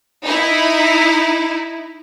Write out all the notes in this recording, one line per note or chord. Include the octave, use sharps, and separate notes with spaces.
D#4 E4